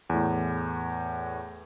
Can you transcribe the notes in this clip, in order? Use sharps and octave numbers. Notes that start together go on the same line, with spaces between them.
E2 A2